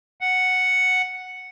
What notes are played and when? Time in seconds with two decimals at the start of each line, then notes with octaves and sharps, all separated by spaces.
0.21 F#5